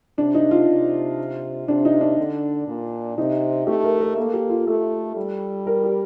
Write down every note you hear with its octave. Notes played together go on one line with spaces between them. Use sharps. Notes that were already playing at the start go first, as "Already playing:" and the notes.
C3 D4
D#4
F4
C3
C3 D4
D#4
D4
D3
A#2
C3 D#4
A3 G4
A#4
A#4
A#3 A4
G4
F4
A3 A4
G3
A#4
G4